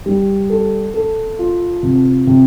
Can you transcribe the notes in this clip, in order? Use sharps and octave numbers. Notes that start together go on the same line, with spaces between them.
G3
A4
A4
F4
C3
C3